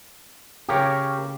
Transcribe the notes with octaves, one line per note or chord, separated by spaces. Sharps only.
C#3 G4 A#4 C#5 G5